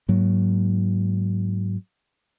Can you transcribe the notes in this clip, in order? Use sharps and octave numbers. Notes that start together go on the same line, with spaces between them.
G#2 F#3 A#3